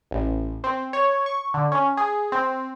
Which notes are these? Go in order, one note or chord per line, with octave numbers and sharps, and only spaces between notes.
A1
C4
C#5
C#6
D3
C#4
G#4
C4